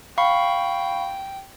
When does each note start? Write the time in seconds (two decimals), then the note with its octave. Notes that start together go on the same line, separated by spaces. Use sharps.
0.18 F5 G5 B5 C#6